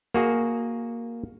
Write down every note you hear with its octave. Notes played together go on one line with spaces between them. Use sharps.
A#3 F#4 G#4